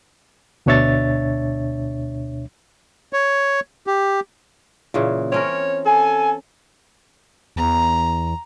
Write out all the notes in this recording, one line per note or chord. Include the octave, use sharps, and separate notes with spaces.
D2 B2 D4 C#5 E5 A6
C#5
G4
A#2 C#3 E3
C4 C#4 A#4 C#5
A4 G#5
E2 A#5